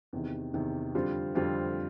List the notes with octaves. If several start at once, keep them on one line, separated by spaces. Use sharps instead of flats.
E2 C3 D#3
E2 C3 D#3
F2 D3 G3 C4 F4
F2 D3 G3 C4 F4